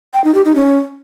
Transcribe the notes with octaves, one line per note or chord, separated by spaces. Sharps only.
G5
D#4
G4
D#4
C#4